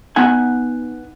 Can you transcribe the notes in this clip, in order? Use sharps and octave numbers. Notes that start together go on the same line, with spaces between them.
B3 D#4 F#5 G#5